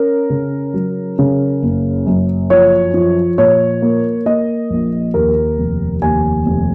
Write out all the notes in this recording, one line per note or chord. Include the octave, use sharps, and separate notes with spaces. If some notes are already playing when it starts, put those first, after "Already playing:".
Already playing: C#4 A#4
C#3
F#3
C#3
F#1
F#2
F3 C#5
F3
A#2 C#5
A#3
A#3 D#5
A#1
D#2 A#4
F1
D#2 G#5
F1